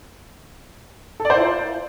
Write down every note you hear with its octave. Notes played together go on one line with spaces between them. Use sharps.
A4
D5
C5
E4
F4